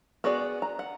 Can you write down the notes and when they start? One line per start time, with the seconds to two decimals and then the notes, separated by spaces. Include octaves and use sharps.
0.24 B3 F#4 G#4 D5
0.62 A#5
0.79 F#5